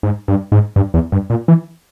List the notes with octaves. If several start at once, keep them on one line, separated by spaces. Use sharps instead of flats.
G#2
G2
G#2
G2
E2
G2
A#2
E3